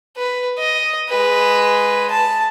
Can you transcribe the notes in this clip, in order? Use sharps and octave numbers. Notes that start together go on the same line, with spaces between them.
B4
D#5
G#3 B4
A5